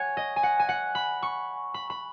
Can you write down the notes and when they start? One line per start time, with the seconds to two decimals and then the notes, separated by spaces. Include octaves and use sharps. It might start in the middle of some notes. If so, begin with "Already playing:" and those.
Already playing: C#5 F#5 G#5
0.17 D#5
0.36 G#5
0.43 F#5
0.60 G#5
0.69 F#5
0.95 B5
1.22 C#6
1.74 B5
1.90 B5